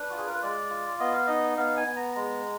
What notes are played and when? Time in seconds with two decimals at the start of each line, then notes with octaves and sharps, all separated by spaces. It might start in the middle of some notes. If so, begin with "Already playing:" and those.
Already playing: D4 B4
0.10 F4 F#4
0.17 G#4
0.26 A#4
0.34 B4
0.42 G#3 D5
0.70 F4
1.00 B3 D#5
1.13 F5
1.27 D#4 D#5
1.57 B3 F5
1.77 G#5
1.86 B3
1.96 A#5
2.16 G#3 A#5